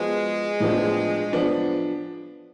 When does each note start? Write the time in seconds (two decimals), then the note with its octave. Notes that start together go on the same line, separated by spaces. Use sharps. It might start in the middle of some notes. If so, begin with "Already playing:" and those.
Already playing: F3 G#3 B3 F#4
0.60 A2 F3 B3 D4
1.33 F3 B3 D4